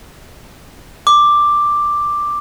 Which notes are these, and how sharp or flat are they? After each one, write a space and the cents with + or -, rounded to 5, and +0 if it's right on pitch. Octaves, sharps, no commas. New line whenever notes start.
D6 +5